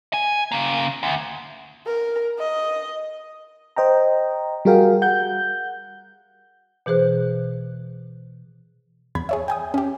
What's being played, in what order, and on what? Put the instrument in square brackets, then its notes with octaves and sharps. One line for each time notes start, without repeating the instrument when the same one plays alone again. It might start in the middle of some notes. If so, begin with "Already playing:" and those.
[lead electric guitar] G#5
C#3 A#3
D2
[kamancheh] A#4
D#5
[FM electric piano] C5 D#5 G5 A#5
G3 F#4 G#4 A#4 F5 G5
F#5 G6
[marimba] B2 E3 G#4 C5 F#6
[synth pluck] E2 B5 G#6
G#4 C#5 E5
G5 G#5 D#6
C#4 G4